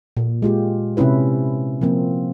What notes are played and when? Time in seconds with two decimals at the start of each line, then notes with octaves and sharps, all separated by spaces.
0.17 A#2
0.42 G#3 F4 G4
0.97 C3 C4 C#4 E4 B4
1.81 F3 A#3 C4